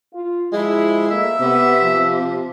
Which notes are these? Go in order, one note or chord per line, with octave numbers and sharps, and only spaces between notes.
F4
F3 G#3 E4
A3 A#3 E5
C3 B3
F3